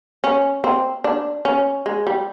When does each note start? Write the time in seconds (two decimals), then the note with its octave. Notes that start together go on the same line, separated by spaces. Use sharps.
0.24 C#4
0.64 C4
1.04 D4
1.45 C#4
1.86 G#3
2.07 G3